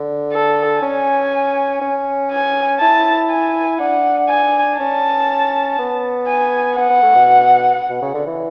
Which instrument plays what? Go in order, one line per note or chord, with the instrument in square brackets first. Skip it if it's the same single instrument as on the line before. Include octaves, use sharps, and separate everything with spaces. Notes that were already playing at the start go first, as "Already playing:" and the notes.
Already playing: [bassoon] D3
[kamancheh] A4
[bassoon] C#4 [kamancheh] G#5
[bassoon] C#4
[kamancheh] G#5
[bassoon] E4 [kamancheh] A5
[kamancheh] G#5
[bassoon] D4 [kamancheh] F#5
[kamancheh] G#5
[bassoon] C#4 [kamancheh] A5
[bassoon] B3
[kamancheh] G#5
[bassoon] B3 [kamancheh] F#5
[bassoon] B3
A3
B2
B2
C#3
D3
E3